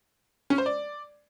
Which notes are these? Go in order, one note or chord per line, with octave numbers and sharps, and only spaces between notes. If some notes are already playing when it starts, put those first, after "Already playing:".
C#4
C5
D5